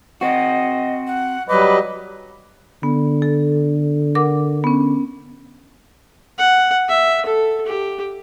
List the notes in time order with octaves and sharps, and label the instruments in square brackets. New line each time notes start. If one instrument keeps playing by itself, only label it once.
[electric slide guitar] C4 F#4 [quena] D#5
[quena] F#5
[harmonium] F#3 G3 D#5 [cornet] B4 [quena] D6
[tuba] D3 [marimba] B3
[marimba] A4
A#4 F#5 D6
B3 C#4
[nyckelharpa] F#5
E5
A4
G4